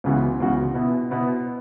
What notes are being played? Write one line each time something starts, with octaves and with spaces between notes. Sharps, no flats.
C#2 C#3 E3 B3 F#4
C#2 C#3 E3 B3 F#4
B2 B3 E4
B2 B3 E4